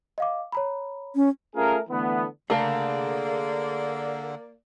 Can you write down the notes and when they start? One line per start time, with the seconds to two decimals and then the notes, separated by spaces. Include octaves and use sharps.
0.18 D#5 F5 D6
0.52 C#5 A#5 B5
1.16 C#4
1.55 A3 C#4 F4 G#4 A#4
1.90 D3 E3 A3 B3
2.50 D3 A3 A#3 G#4 A#4 D5 F5